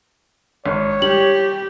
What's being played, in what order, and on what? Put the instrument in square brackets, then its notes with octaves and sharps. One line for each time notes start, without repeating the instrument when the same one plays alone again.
[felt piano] G#1 [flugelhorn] C#5
[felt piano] G3 [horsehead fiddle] G4 [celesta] F#7